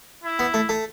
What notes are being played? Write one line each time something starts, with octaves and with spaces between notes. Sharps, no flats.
E4
B3
A3
A3